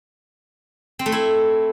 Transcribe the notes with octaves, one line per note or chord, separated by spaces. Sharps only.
C4
A3
E4